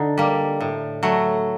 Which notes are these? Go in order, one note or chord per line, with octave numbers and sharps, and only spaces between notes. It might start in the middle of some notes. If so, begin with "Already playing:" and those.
Already playing: D3 D#4
G3 A#3
A2
F#3 A3